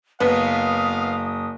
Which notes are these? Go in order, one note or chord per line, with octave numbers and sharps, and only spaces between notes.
F#1 B3 F5 D#6